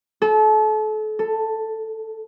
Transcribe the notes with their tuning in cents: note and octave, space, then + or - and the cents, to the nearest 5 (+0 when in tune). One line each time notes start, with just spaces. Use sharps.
A4 -35
A4 +5